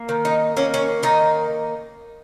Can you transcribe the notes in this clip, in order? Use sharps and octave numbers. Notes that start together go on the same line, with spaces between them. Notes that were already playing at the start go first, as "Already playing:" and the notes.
Already playing: A#3
D#3
D#4
A#3 C#4
C#4
D#3 D#4